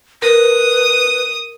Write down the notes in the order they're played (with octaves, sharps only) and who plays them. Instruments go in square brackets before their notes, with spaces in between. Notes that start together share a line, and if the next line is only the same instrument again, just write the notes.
[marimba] A#4 [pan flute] B4 [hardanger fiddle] D#6